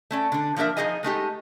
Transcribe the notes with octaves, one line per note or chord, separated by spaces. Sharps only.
A3 C#4 D5
D3 D4
F3 A#3 D4 A#4 E5
F3 C4 D#4 G#4 D#5 G#5
G#3 A3 D#4 G4